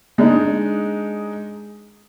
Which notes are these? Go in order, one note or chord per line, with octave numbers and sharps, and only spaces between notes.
G#3 D4 D#4